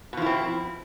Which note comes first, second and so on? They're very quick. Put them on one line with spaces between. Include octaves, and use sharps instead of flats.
B2 F3 E4 C4